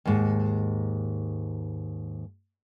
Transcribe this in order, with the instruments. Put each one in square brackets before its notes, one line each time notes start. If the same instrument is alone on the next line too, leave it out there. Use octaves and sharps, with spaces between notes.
[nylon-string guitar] D#2 G#2